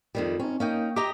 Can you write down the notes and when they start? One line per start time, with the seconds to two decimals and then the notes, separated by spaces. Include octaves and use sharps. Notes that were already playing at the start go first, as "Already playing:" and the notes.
0.15 F2 D#3 G3
0.40 C4 C#4 D#4
0.60 A#3 C#4 D#4 G5
0.96 G4 D#5 A#5 D6